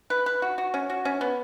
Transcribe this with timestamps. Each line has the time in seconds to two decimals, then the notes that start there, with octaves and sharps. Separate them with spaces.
0.10 B4
0.26 B4
0.42 F#4
0.58 F#4
0.74 C#4
0.90 F#4
1.05 C#4
1.21 B3